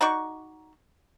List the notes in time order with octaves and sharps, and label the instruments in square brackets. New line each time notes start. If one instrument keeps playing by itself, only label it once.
[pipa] D#4 F#4 D5 C#6